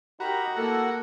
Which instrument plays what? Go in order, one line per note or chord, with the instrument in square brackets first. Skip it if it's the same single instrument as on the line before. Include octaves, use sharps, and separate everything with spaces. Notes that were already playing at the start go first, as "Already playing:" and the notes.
[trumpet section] D#4 G4 A#4 [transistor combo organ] F#4 [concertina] A#5 B5
[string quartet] A#3 [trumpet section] E4 A4 [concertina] F#5